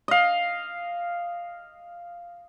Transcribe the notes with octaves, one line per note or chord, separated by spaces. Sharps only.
D#5 F5